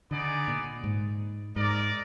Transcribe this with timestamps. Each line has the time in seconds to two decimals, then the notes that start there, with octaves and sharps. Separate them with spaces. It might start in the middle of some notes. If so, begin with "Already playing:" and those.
0.11 D3 B3 D#4 G#4 D5
0.48 A#2
0.84 G#2
1.56 G#2 D#4 A#4 D5